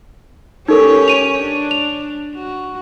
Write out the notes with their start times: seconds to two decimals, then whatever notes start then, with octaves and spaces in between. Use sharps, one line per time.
0.68 C#4 D#4 G4 A4 A#4 C#5
1.08 D#7 F7
1.41 D4
1.71 F7
2.35 F#4